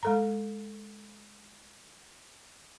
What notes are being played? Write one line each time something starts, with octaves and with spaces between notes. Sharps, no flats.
G#3 A4 A#5